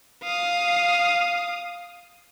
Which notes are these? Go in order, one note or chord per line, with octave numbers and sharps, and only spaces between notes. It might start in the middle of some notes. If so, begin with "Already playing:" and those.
F5 D#6